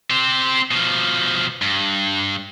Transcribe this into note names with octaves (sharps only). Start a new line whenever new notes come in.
C4 G4
B2 F3
G2